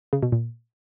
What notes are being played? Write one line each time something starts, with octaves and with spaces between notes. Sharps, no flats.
C#3
B2
A#2